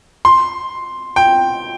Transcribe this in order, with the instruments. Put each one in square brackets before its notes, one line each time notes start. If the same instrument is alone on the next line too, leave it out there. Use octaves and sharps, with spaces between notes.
[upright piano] C6
G5